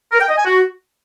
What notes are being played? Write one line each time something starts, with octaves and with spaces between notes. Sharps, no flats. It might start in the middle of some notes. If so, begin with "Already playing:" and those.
A#4
G5
D#5
G#5
F#4